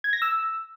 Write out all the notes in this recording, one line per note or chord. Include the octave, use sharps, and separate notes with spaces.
G#6
A#6
E6